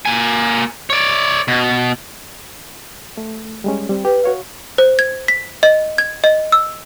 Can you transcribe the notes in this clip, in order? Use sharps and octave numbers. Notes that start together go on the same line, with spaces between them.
A#3 G#5
C#5 D5
B2
A3
G3 G#3 C#4
G3 C4
G4 B4
F#4 C#5 F5
C5
G#6
B6
D#5
G#6
D#5
E6